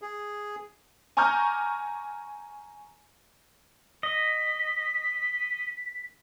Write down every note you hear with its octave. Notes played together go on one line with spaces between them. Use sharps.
G#4
G#5 A#5 C#6 D6 F6 G6
D#5 B6